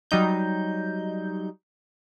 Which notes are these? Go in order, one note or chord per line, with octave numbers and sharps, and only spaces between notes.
F#3 G3 D#4 G6